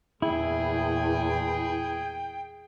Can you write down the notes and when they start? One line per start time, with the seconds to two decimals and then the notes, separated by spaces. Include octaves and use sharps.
0.22 E2 A#2 E4 G#4 G5